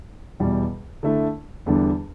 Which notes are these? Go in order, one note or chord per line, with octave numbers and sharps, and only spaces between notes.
E2 B2 G3
D3 A3 E4
E2 D3 G3 D4